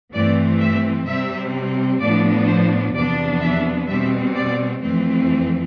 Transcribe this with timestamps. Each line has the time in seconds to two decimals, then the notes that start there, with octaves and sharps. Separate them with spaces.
0.12 G2 E3 A3 C4 D5
0.59 E5
1.05 C3 G3 C4 E5
1.99 A2 F3 B3 D4 D5
2.46 C5
2.93 E2 C3 F3 B3 D4 D5
3.40 E5
3.87 B2 G3 C4 E5
4.35 D5
4.81 F2 E3 A3 C4